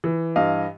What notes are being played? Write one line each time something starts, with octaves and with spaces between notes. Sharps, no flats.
E3
G2 D#5 F5